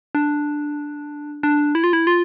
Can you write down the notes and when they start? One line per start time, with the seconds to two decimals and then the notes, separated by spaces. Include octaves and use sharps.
0.15 D4
1.43 D4
1.75 E4
1.84 F4
1.93 E4
2.07 F4